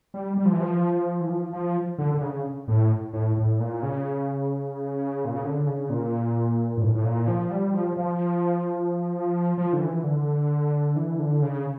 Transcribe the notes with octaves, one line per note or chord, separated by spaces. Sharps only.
G3
G3
F3
E3
F3
E3
F3
F3
D3
D3
C#3
A2
A2
A2
A#2
C#3
A#2
C#3
D3
C#3
A#2
G2
A2
A2
A#2
F3
G3
F3
F3
F3
D3
E3
D3
E3
D3
C#3